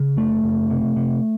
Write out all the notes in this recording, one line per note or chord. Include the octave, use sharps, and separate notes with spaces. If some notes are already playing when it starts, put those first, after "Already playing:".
Already playing: C#3
F#1 A3
F#1
C3
C3